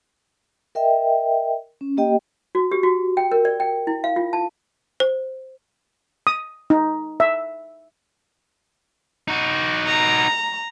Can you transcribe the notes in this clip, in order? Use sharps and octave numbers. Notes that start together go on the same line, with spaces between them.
A#4 D#5 E5 G5
C#4
A#3 G4 D#5 G5
F#4
G4
F#4
G5
A#4
D5
G5
E4
F5
F4
A5
C5
D#6
D#4
E5
D#4 F#4
A#5